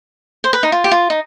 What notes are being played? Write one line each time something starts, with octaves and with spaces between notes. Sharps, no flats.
C5
B4
D#4
F4
G4
F4
D#4